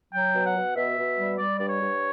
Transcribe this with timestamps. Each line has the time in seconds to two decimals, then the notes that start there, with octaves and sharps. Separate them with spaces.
0.13 F#3 G5
0.34 B2
0.45 F#5
0.55 B2
0.76 B2 E5
0.97 B2
1.17 G3
1.38 G3 D5
1.58 G2 D5
1.69 C#5
1.80 G2